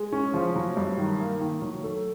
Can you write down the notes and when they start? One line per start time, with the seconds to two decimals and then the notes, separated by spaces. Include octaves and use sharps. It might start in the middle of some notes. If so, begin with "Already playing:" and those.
Already playing: G#3
0.12 C#4
0.34 F3
0.56 F#3
0.77 G2
0.98 D#3
1.20 A#3
1.41 D#3
1.62 F#3
1.84 A3